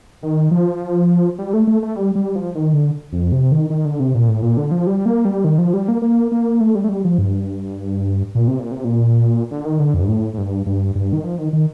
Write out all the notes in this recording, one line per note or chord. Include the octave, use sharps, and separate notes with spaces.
D#3
F3
G3
A3
A3
A3
G3
G3
F3
D#3
D3
F2
C3
D#3
D#3
D3
C3
A#2
A2
A#2
D3
F3
G3
A#3
G3
D#3
F3
G3
A#3
A#3
A#3
A3
G3
A3
G3
F3
G2
A#2
C3
A#2
C3
A#2
D3
D#3
D3
F2
G2
A2
A2
G2
G2
G2
D#3
F3
D#3
D#3